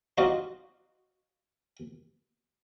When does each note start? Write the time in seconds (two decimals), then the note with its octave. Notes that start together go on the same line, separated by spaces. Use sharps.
0.18 D#4 F4 F#4 D5 D#5